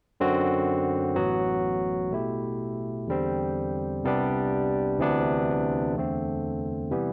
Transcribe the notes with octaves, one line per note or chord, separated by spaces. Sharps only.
F#2 D3 F#3 C4 F#4
A1 A2 F#3 B3 F#4
B2 A3 E4 G4
E2 D3 G3 C4
C2 C3 G3 B3 D4
D2 C3 E3 B3 D4
E2 D3 A3 C4
C3 E3 G3 B3